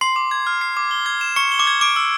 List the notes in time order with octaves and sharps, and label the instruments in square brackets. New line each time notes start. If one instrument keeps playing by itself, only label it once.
[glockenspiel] C6 [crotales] C7
[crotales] D6
G#6
F6
C7
D6
G7
G#6
E7
[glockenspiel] C#6 [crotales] C#7
[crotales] G7
[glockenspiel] D6
[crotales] G#6
[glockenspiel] D6 [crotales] D7
[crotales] E6